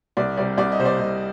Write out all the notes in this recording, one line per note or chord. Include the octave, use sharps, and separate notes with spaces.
C2 D5
C3 G3 D5
C2 D5
D#5
C3 G3 C5
D5
C2 D#5